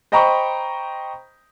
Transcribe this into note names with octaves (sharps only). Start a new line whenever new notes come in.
C5 D#5 G5 A#5 B5 C#6